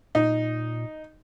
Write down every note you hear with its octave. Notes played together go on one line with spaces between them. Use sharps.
A#2 D#4